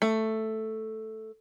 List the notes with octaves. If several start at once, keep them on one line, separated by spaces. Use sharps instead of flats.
A3